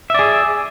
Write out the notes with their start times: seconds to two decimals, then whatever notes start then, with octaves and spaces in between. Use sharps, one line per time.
0.10 E5
0.14 D5
0.19 G#4